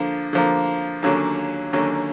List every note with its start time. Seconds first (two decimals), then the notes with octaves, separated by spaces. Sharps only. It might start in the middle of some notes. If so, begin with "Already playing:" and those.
Already playing: D3 F3 A#3
0.33 D3 F3 A#3
1.02 D#2 D3 F#3 A#3 C#4
1.73 D#2 D3 F#3 A#3 C#4